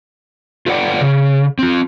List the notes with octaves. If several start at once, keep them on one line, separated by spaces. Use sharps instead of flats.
F4 A4 B4 D5 F#5 G5
C#3
C4 F4